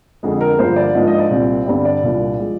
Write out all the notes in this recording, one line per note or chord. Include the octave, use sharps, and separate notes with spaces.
F2 D3 G#3
A#4
G2 D3 F3 A#3 D4 C5
D5
G#2 F3 A#3 D4 D#5
D#5
D5
C2 A#2 G3 C4
G2 D3 G3 C4 D5
D5
C2 A#2 G3 D4
F3 G#3